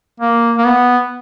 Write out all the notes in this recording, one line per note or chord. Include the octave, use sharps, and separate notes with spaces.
A#3
A#3
B3